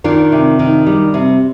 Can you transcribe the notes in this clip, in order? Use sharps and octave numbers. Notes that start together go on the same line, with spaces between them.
D#3 D4 F4
C3
D#3
G3
C3